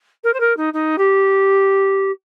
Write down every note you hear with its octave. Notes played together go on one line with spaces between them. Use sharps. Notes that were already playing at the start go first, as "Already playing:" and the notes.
A#4
C5
A#4
D#4
D#4
G4